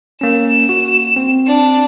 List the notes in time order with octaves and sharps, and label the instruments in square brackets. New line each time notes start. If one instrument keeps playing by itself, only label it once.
[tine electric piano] A#3 C#4 [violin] E7
[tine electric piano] F#4
C4
[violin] D4